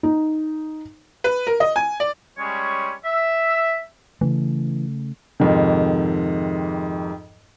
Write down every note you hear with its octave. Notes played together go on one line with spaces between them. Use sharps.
D#4
B4
A#4
D#5
G#5
D5
G3 G#3 C#4 C#5
E5
C#3 E3 A3
F2 G#2 C3 D#3